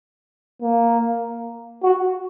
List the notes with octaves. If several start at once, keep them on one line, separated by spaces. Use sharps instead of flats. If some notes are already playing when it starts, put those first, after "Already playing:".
A#3
F#4